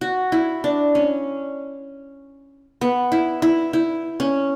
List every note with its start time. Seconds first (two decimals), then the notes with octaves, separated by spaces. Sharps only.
0.01 F#4
0.32 E4
0.64 D4
0.95 C#4
2.81 B3
3.12 E4
3.42 E4
3.73 E4
4.20 C#4